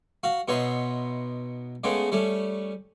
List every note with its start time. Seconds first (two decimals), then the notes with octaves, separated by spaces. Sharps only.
0.23 F#4 F5
0.48 B2 B3 D#4 C#5 E5 C6
1.84 C#3 G#3 A3 B3 C#4
2.12 G3 A3 C#4